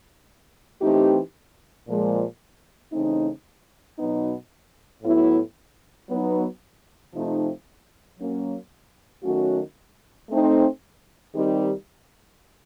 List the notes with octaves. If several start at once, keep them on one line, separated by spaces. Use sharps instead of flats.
E3 A3 C4 D#4 G4
A#2 F3 G#3
C#3 E3 A3 C4 D#4
B2 F#3 B3 D#4
A2 F#3 B3 E4
F#3 B3 D#4
C3 F3 A3 C4 D#4
F#3 A#3 C#4
D#3 F#3 A3 C#4 F#4
A3 C4 D#4
D#3 G3 C4 D#4 G4